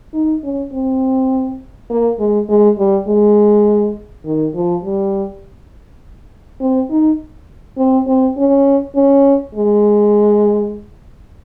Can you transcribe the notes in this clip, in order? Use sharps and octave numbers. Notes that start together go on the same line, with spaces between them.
D#4
C#4
C4
A#3
G#3
G#3
G3
G#3
D#3
F3
G3
C4
D#4
C4
C4
C#4
C#4
G#3